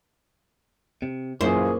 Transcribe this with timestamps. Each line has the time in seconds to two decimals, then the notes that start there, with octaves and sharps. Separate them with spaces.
1.02 C3
1.41 F#2 A#2 E3 A#3 C#4 F4 G#4 C5